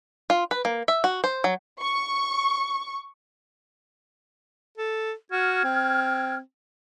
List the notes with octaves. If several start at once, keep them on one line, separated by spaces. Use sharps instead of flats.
F4
B4
A#3
E5
F#4
C5
F#3
C#6
A4
F#4 F6 G#6
C4